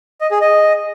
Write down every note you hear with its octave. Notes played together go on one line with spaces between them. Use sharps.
D#5
G#4
D#5